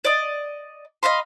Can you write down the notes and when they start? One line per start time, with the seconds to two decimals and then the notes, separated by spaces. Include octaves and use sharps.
0.05 D5 D#5
1.03 D#5 F5 B5 C6